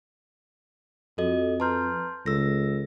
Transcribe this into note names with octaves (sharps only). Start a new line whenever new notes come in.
F2 F#4 A4 D#5
B4 A5 A#5 C6 F6 G6
C#2 A4 E6 A#6